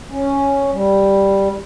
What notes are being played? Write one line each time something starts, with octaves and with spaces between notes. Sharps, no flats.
C#4
G3